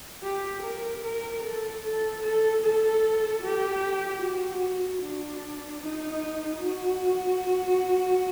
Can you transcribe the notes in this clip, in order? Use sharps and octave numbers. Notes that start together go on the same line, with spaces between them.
G4
A#4
A#4
A4
A4
A4
A4
G4
F#4
D4
D#4
F#4